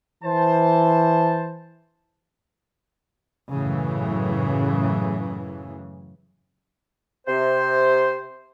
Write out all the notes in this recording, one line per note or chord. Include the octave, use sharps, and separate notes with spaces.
E3 C5 A5
F#2 A2 C#3 E3
C3 C5